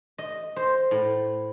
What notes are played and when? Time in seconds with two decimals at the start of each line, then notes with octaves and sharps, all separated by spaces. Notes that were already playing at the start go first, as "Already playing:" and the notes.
0.18 D#5
0.56 C5
0.91 A2